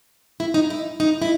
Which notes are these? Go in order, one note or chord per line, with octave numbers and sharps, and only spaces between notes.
E4
D#4
E4
D#4
E4